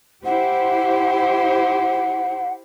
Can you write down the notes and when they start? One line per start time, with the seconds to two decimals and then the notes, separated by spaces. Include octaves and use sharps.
0.25 E4 G4 C5 F#5